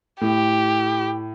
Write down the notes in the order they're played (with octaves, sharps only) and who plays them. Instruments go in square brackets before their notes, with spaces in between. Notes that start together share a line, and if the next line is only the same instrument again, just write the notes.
[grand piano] A2 [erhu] G4